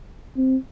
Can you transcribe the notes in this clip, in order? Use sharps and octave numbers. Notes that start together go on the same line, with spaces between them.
C4